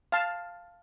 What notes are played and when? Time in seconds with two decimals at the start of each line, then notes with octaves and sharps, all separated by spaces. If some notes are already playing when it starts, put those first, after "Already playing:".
0.12 F5 A5